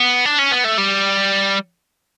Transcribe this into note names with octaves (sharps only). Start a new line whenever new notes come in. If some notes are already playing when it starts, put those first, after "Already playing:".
Already playing: B3
D4
C#4
B3
A3
G3